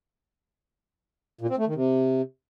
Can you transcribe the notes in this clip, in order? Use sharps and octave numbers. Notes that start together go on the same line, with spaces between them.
A#2
C4
A3
D#3
C3